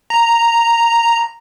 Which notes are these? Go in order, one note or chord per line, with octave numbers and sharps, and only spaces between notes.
A#5